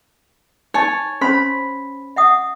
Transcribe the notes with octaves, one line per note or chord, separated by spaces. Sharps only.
D#4 C#5 G#5 A5
C#4 C5 B5 C6
E5 F#5 D#6